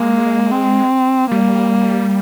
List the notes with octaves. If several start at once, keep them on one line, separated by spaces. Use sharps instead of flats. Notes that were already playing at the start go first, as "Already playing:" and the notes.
Already playing: G#3 A#3
C4
G3 A#3